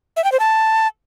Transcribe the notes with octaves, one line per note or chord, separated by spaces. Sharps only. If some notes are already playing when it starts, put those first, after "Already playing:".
E5
G5
C5
A5